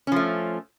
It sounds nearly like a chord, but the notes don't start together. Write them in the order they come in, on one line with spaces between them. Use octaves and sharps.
C#4 F3 A3